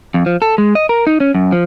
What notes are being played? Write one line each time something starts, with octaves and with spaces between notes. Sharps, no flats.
F2
F3
A4
G#3
D#5
A#4
D#4
C#4
F#2
F3